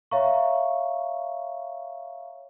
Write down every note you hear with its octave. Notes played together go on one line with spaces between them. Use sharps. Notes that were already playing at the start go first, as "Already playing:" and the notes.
C#5 E5 F5 A#5 C#6